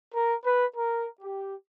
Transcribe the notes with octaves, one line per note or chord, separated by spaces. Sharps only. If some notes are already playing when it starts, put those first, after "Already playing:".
A#4
B4
A#4
G4